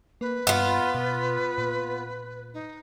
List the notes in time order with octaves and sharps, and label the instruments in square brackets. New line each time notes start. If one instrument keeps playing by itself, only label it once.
[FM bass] A#3 [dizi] B4
[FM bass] G2 [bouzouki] B3 F4
[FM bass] B2
A#2
[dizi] D#4